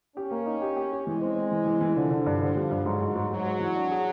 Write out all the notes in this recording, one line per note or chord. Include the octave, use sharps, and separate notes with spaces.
C#4 G4
A#3
D#4
G4
G4
G4
E3 G#3
C4
C4
E3
E3
E3
D3 F3
D3
G2
D3 F3
G3
G2
G#2 F#3
G#2
G#2
G#2 F#3
G#2
E3
D4
G#4